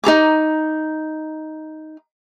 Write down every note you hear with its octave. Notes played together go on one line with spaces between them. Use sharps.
D#4 A4 A#5 D6